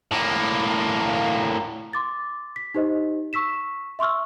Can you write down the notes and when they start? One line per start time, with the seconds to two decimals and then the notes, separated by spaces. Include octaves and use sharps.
0.11 A2 A#3
1.93 C6 D6 A6
2.56 B6
2.74 D#4 G4 C5 D#5
3.33 C#6 E6 B6 E7
3.99 E5 C6 C#6 E6 F6